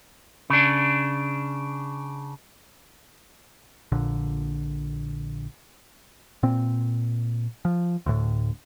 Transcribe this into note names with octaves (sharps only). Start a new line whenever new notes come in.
C#3 D4
A#1 A#2 D3
A#2 C4
F3
D2 A2